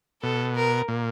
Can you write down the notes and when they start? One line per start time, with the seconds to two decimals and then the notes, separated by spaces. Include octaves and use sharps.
0.22 B2 A4
0.55 A#4
0.88 A#2